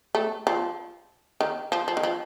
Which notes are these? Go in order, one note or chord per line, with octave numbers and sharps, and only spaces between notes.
A3
F3
D#3
F3
F3
D#3
F3